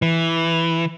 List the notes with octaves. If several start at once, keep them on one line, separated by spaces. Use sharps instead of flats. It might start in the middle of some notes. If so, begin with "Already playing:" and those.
E3